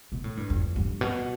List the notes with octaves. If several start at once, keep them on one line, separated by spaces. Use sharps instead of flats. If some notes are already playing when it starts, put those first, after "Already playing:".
B2
A2
G2
F2
G2
B2